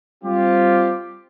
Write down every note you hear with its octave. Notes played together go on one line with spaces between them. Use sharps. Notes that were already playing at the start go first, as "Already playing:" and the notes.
G3 C4 F4 G4